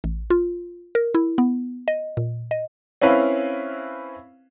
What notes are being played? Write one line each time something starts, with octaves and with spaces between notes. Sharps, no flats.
A1
F4
A#4
E4
B3
D#5
A#2
D#5
C4 C#4 E4 B4 F5